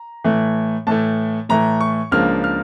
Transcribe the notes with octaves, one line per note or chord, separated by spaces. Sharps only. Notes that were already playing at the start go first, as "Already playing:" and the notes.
Already playing: A#5
A2 E3 A3
A2 E3 A3 A5
A2 E3 A3 A#5
C#6
C#2 C#3 F3 A#3 D4 F6
F6